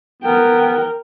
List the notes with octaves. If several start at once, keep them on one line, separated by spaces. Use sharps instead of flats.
B3 A#4 G5